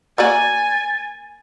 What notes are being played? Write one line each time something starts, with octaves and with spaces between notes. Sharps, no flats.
A#3 F#4 D5 G#5 A6